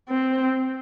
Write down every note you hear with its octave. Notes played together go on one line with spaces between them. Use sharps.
C4